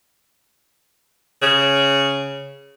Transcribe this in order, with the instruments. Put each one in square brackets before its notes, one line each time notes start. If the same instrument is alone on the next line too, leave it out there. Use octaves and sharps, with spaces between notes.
[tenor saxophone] C#3